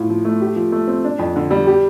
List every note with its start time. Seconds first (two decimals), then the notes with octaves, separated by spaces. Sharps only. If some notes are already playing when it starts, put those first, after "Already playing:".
Already playing: A2 F4
0.10 F3
0.25 A3
0.41 G4
0.56 F3
0.72 A3
0.88 C4
1.04 D4
1.19 F2
1.36 D3
1.51 G3
1.67 G4